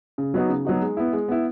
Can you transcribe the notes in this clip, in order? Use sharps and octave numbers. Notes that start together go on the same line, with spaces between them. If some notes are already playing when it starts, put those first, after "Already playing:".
C#3
F#3 B3 D#4 F#4
C#3
F#3 B3 D#4 F#4
G#3
B3 E4
G#3
B3 E4